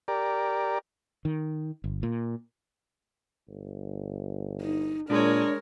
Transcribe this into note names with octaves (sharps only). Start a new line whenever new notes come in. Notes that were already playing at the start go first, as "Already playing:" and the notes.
G4 A#4 D5
D#3
G1
A#2
G1
D#4
A#2 G#3 D4 A#4 C#5